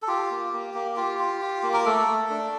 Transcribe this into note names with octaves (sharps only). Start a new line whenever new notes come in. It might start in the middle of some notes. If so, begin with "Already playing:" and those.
A4
F4 G4
A#3
A#3
A#3
F4 G4
F4
F4
A#3
A#4
A3 A4
A3
D4